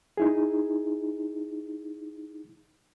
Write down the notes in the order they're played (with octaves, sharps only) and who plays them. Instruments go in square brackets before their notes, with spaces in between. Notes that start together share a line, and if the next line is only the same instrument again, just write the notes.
[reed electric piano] D#4 E4 G#4